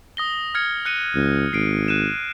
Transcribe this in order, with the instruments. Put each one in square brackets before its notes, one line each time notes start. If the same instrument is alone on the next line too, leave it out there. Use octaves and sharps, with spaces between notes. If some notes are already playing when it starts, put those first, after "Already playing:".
[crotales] D#6 A#6 G7
F6 G#6 C#7
F#6 C#7 D#7
[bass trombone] C#2
[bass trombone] G#1 [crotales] C7 D7
[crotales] F#6 D#7 E7